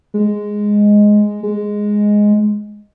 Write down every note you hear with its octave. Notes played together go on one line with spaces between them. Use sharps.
G#3
G#3